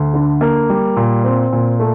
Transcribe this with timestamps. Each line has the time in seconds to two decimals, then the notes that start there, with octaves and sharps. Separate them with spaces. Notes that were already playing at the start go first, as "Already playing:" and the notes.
Already playing: D2
0.14 D3
0.41 A#3
0.70 G3
0.96 A#2
1.24 C4
1.52 A#2
1.79 A3